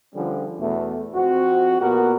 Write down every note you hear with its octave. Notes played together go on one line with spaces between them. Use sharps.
D3 F3 G3 C#4 G#4
E2 B2 A3
F2 C4 F#4
A#2 B3 F#4 G4 A#4